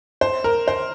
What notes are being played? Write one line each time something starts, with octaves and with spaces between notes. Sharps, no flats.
C5
A#4
C5